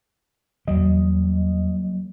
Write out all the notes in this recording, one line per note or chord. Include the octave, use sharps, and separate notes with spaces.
E2 F#3 G3 A#3 D#5